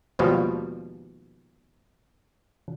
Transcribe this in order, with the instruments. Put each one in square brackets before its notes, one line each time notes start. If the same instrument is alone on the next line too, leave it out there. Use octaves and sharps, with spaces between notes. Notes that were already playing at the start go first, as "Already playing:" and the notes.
[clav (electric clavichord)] D#2 G#2 B2 F3 G3